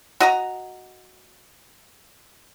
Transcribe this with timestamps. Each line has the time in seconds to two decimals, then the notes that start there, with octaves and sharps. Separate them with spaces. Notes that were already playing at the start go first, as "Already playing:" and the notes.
0.20 F#4 D#5 A#5